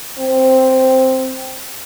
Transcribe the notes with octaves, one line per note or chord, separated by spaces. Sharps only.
C4